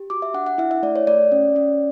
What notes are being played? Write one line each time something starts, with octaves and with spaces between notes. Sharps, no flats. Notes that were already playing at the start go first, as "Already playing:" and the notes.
Already playing: G4
F#4 D6
E5
D4 F#5
F#5
E4 E5
E5
A3 D5
C#5
A3 D5
C#4
C#4